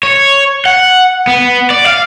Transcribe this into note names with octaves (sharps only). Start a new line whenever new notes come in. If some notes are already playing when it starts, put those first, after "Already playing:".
C#5
F#5
B3
D5
F5